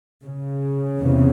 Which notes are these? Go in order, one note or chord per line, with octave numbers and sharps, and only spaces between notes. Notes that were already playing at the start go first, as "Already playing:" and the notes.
C#3
E2 C3